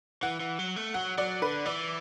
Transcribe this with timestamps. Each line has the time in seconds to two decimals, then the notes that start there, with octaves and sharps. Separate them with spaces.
0.23 E3 F#5
0.40 E3
0.59 F#3
0.76 A3
0.94 F#3 F#5
1.18 F#3 D5
1.42 D3 B4
1.65 E3 D5